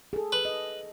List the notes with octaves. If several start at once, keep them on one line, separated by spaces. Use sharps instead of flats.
G#4 A4
B4
D#5